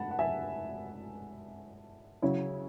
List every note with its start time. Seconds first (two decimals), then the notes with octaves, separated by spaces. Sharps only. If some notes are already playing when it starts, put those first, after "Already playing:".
Already playing: G#2 A3 F#5 A5 B5
0.11 F#5
0.19 E5 G#5
2.22 C#3 F#3 C#4 E4